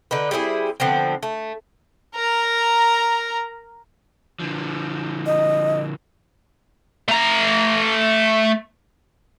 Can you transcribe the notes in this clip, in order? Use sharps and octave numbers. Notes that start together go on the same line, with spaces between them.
D3 D#4 B4
G3 C4 E4 G#4
D3 F3 B3 C4
A3
A#4 A#5
D3 F3
D#5
A3 A#5